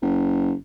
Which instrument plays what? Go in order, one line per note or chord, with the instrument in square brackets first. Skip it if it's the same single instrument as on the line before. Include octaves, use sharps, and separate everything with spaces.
[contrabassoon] F#1